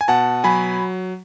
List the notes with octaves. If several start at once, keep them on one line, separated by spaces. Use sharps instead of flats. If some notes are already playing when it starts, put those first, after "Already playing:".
G#5
B2 F#5 A5
F#3 G#5 B5